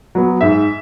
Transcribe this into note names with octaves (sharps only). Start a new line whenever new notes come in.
F#3 B3
G#2 E5